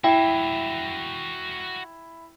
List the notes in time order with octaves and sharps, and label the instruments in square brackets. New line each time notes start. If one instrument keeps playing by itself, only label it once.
[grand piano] E4 [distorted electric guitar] F#4 E5 [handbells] G5